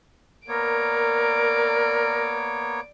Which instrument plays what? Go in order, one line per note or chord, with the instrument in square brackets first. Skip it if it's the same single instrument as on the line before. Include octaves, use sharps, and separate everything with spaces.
[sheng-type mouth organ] A#3 B3 C#5 [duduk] A#4 [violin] D5 D7